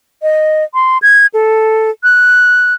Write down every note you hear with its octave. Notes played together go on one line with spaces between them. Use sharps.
D#5
C6
G#6
A4
F#6